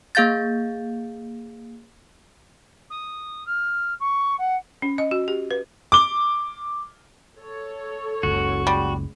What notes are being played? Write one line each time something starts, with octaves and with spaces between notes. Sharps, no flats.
A#3 G#4 F5 G6 A6
D#6
F6
C#6
F#5
C#4
D#5
F#4
G4
B4
D6 G7
A4 C#5
F#1 C#2 F#4
G3 G#3